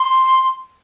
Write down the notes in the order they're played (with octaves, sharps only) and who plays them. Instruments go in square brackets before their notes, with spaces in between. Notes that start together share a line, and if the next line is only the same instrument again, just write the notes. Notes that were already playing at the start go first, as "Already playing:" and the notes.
Already playing: [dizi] C6